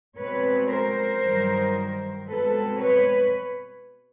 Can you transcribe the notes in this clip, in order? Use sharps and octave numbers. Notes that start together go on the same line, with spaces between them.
B2 G#3 C4 B4 C#5
A#4 C5
G2 D#3 F#3
B2 G#3 C4 A4 B4
B4 C#5